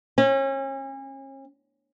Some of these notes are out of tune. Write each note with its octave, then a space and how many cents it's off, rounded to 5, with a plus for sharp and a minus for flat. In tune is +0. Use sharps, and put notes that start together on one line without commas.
C#4 -35